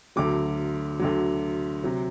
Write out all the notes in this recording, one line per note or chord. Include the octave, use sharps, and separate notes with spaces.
D2 D3 F#3 D6
D2 D3 F#3
C3 F#3